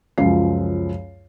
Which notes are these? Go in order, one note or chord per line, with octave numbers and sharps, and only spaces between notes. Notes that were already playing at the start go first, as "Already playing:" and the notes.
C#2 F#2 F3 C7